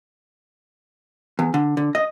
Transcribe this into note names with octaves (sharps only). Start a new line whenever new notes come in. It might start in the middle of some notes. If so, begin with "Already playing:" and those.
E2
D3
D3
D#5